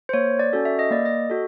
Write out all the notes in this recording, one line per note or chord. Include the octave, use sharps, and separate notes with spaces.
C5
A#3 C#5
D5
C#4 F#4 A4
E5
D#5
A#3 D5
D#5
F#4 A4